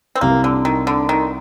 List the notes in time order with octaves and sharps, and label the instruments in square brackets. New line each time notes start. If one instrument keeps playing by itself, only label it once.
[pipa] C4
[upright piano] C2 C3 G3 [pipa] A#3
[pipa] D3
D#3
D3
D#3